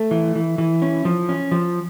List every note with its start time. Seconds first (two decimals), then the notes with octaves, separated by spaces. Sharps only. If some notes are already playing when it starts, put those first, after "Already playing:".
Already playing: A3
0.11 E3
0.35 E3
0.58 E3
0.82 C#4
1.05 F3
1.29 C#4
1.51 F3